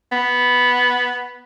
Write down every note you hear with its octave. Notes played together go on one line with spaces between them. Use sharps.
B3